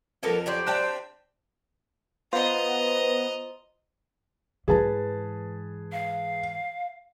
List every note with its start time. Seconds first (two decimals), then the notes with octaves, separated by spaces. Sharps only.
0.23 F2 F3 A#3 B3 A4 A#4
0.46 F#3 G4 C5 D5
0.67 C3 C4 D4 G5 A5 F#6
2.33 B3 F4 C5 D#5 A#5
4.68 G#2 E3 G#4 B4 A5
5.92 F5